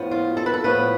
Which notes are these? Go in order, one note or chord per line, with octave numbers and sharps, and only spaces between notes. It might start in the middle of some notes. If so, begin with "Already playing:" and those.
Already playing: A2 F3 B3
F4
A4
B4
A4
A2 F3 B3 B4